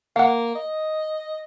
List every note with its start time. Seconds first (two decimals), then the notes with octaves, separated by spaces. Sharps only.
0.16 A#3 F5 F#5
0.55 D#5